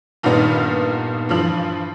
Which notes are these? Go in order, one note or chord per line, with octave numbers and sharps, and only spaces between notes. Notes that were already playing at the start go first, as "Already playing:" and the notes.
G2 A#2 D#3 G3 B3 D#4
G2 E3 F3 F#7